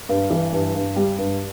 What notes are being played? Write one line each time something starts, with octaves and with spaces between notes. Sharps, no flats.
G2
E3
G2
G2
G3
G2